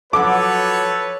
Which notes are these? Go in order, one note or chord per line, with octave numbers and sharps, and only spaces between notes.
F3 F#3 F#4 A4 B4 C#5 D6